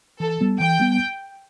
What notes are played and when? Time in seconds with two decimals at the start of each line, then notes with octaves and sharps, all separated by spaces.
0.20 E3 A4
0.41 G3 B3
0.60 E3 G5
0.80 G3 B3